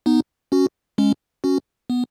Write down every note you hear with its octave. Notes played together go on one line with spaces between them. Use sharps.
B3 D#4
C#4 F#4
G#3 C#4
C#4 F#4
B3